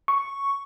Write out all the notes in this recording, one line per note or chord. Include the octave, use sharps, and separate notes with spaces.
C#6